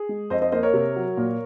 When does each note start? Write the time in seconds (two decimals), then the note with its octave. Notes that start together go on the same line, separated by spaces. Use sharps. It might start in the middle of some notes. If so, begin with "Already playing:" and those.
Already playing: G#4
0.09 G#3
0.30 F2 C5 D#5
0.42 C5 D#5
0.52 A#3 C5 D#5
0.63 A#4 C#5
0.74 C3
0.96 F#3
1.17 A#2